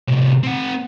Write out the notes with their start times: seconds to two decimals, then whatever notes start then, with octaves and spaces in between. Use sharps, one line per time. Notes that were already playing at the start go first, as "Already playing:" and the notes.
0.08 A2 C3
0.43 C4 F#5